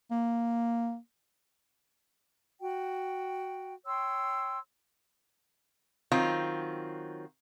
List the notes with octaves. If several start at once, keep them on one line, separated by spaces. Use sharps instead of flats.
A#3
F#4 G5
C#5 G5 C6 E6
D#3 F#3 C4 F4